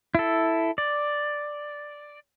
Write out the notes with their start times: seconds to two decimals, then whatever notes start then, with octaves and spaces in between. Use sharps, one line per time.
0.15 E4 A4
0.78 D5